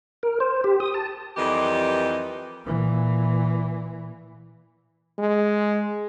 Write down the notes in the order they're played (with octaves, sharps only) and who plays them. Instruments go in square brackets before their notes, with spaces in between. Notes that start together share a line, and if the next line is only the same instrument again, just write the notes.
[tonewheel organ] A#4
C5
G4
D#6
A5
[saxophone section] F2 E3 G3 G4 A#4 D#5
[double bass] A#2 E3
[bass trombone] G#3